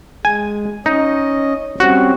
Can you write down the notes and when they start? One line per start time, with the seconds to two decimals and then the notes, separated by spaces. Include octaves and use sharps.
0.25 G#3 G#5
0.86 C#4 D#4 D#5
1.80 G3 C4 C#4 F#4